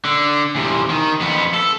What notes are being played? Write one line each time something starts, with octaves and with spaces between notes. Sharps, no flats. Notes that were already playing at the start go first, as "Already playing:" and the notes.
D3
E2 C3
D#3
F2 B3
A4